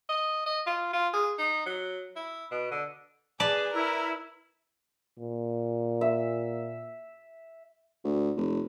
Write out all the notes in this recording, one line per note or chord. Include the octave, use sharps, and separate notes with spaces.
D#5
D#5
F4
F4
G#4
D#4
F#3
E4
B2
D3
G#4 B4 D5 A5
E4 A#4
A#2
E5
D2
F1